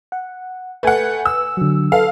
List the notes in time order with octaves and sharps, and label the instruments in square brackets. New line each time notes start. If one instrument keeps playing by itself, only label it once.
[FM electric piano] F#5
[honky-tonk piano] A3 F#5 [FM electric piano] B4 G#5
[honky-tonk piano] E6
[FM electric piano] D3 F#3
[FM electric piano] A4 B4 [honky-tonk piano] F5